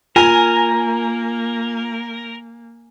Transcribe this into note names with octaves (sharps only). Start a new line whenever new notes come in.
A#3 F4 A#4 G#5